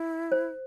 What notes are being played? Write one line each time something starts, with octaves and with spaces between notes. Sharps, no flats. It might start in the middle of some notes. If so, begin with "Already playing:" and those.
Already playing: E4
C5